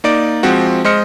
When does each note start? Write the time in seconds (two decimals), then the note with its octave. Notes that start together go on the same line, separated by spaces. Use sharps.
0.04 A#3 D#4 D5 D7
0.43 F3 G#3 C4 F#4
0.85 G#3 C5 D#5 F6 C#7